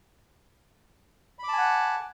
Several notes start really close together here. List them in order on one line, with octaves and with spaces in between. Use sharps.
B5 D6 A5 G#5 F#5